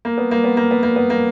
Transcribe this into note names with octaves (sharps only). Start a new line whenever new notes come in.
A#3
B3
A#3
B3
A#3
B3
A#3
B3
A#3